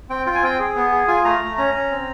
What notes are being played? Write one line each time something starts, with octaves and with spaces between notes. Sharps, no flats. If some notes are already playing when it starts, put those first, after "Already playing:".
C4 G5
F4 G5
G#5
C4 G5
G#4
B3
G#4
F4 G#5
A3 A#5
A3
C#4 A#5
C#4
C4